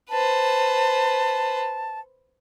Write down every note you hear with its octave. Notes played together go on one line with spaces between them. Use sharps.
B4 C5 A5